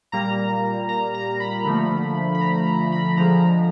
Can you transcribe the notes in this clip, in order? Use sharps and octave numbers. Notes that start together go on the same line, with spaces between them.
A#2 G3 A#3 A#5
A#5
A#5
B5
D3 F3 A3
B5
A#5
A#5
B5
D3 F3 G#3 A#5